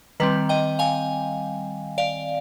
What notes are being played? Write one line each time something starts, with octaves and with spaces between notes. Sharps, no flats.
D#3 G3 C4 B4
D#5 G5
F5 G#5
D5 F5